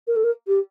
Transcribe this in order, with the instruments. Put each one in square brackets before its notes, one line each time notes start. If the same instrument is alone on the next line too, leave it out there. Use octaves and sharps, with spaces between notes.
[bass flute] A#4
A4
A#4
G4